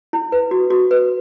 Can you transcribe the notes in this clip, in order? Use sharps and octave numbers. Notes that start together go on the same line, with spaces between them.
E4
B4
F#4
F#4
B4